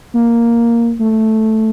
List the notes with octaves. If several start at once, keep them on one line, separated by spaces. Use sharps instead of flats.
A#3
A3